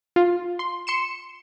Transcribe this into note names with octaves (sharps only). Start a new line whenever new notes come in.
F4
C6
C6 C#7 E7